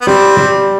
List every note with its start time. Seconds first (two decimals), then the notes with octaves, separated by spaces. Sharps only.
0.01 B3
0.07 G3 C4
0.37 G3